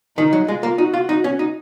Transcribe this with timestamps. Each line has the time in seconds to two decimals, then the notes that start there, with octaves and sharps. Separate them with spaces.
0.18 D#3 D#4
0.33 F#3
0.48 G#3 F4
0.63 A#3
0.78 D#4 F#4
0.94 F4
1.09 D#4
1.24 C#4
1.39 D#4